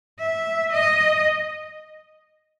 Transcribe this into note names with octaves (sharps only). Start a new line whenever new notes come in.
E5
D#5